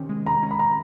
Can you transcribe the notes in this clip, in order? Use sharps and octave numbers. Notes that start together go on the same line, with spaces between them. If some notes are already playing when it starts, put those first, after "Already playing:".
Already playing: C3 D#3 C#4
G#3
D#3 A#5
C#4
B5
C3 A#5